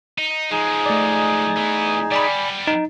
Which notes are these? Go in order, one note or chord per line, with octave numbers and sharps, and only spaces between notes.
D#4
F3 G#3 D#4 G#4
A3 D5
E3 B3
G3 B3 D5 G#5 B5
D#4